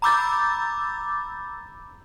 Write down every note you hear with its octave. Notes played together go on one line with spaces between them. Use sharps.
A#5 B5 D6 E6 G6 A6